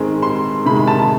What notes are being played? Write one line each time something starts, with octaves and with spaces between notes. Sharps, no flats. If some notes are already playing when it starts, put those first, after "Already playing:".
Already playing: G#2 D#3 G#3 C4
C6
C3 D#3 G#3 B5
B5
A5
A5